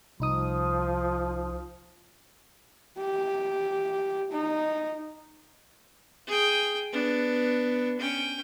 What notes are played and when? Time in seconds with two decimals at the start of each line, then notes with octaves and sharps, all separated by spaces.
0.20 C2 F3 D#4 D#6
2.98 G4
4.32 D#4
6.27 G#4 G5
6.92 B3 D4
7.99 C#4 G5